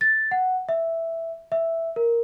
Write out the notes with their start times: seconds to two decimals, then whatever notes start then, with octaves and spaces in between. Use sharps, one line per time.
0.01 A6
0.31 F#5
0.69 E5
1.52 E5
1.96 A#4